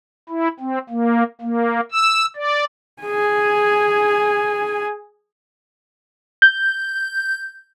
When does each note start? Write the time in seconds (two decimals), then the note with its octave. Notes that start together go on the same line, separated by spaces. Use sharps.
0.29 E4
0.60 C4
0.89 A#3
1.41 A#3
1.92 E6
2.36 D5
3.02 G#4 G#5
6.42 G6